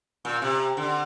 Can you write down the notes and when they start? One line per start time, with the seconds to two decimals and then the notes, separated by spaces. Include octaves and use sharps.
0.25 A#2
0.42 C3
0.77 D3